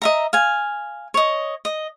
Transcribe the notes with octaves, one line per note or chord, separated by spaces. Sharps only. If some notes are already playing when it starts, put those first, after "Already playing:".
D#5 E5 A#5
F5 G#5
C#5 D#5
D#5